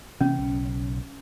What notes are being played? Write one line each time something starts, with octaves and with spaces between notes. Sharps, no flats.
C3 E3 A#3 C#4
B1 C#3